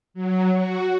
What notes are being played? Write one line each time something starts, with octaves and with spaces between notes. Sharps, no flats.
F#3
F#4